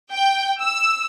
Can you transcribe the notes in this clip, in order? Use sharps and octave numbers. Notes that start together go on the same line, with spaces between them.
G5
E6